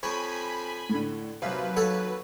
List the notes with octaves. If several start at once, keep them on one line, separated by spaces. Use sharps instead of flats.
F2 C#5 G#5 B5
A2 D3
D#2 C3 F#3 B4 F5
A4 C#5 F#5